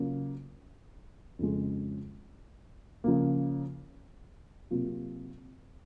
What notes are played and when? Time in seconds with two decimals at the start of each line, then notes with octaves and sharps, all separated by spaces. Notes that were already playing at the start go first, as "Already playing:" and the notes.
Already playing: C#3 F#3 A#3 F4
1.39 F2 C#3 G#3
3.04 C#3 F3 A#3
4.70 C3 F#3 A#3 F4